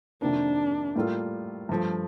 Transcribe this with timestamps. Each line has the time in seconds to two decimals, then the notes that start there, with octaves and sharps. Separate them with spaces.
0.21 F2 C3 D#3 A#3 D4
0.95 A2 G3 A#3 F4 A4
1.69 G2 F3 A3